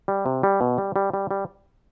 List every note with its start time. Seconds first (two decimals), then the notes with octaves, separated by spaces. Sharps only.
0.08 G3
0.26 C3
0.43 G3
0.61 B2
0.78 G3
0.96 G3
1.14 G3
1.31 G3